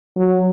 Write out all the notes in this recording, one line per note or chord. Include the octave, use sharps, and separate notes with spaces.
F#3